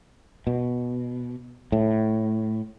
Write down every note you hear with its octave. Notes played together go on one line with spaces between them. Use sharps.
B2
A2